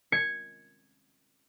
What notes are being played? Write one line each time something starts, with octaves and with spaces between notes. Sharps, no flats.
G#6 C#7